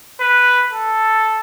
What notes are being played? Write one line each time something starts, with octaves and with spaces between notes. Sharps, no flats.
B4
A4